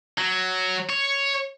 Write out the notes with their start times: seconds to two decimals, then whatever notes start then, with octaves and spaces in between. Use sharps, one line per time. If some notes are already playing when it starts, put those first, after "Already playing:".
0.18 F#3
0.89 C#5